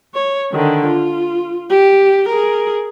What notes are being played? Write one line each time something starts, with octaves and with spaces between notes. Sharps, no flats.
C#5
D3 D#3
F4
G4
G#4 A#4